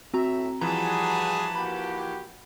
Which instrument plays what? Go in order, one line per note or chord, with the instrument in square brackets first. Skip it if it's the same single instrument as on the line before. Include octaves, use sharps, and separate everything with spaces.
[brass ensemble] A2 E5 [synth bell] C4 F#4 A#5
[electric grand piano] E3 F3 [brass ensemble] G3 F#4 G#4 [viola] B4 A5 [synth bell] A#5
[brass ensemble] A#3 F#4 G4 [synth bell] B5